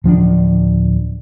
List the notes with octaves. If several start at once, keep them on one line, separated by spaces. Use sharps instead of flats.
D1 F3 C#4 D4